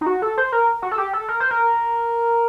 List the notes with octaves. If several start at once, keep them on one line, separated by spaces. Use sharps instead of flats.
D#4
F#4
A4
C5
A#4
F#4
A4
G4
A4
A#4
C5
A#4